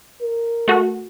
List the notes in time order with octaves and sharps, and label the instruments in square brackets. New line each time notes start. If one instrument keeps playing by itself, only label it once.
[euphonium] A#4
[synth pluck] A3 F#4